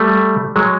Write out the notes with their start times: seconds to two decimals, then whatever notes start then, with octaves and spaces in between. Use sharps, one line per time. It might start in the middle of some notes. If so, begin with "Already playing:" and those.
Already playing: G3 A3
0.56 F#3 G#3